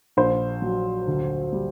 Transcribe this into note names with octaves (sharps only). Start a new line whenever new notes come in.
A#1 C5
F#3
D2
G3